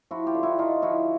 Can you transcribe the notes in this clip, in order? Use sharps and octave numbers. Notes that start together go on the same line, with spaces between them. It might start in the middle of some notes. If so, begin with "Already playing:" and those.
F3 E4 F#4
F4 G4
D3
E4 F#4
D3 D#4 F4
F3 E4 F#4